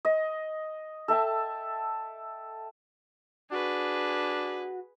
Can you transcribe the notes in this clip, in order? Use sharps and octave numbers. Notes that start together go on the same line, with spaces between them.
D#5
A4 E5 G5 A5
D4 F#4 G#4 B4